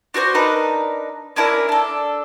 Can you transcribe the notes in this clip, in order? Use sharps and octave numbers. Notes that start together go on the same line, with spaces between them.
D4 F#4 A#4 C5
D4 D#4 A#4 B4
C#4 D4 E4 A#4
D4 A4